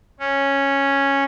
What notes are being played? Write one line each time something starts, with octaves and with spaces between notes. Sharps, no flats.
C#4